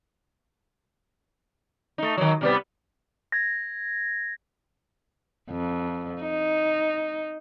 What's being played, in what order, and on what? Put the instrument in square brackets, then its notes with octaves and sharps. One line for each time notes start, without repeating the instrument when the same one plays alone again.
[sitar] A3 D#4
D#3 F#3
C3 G3 B3
[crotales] G#6 A#6
[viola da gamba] F2
D#4